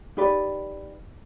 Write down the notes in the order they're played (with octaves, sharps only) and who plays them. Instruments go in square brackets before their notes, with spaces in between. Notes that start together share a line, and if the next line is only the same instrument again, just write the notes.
[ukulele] D#4 G4 B4 D5